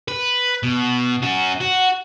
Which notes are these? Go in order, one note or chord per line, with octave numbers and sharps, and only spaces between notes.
B4
B2
C#4 F#4
F#4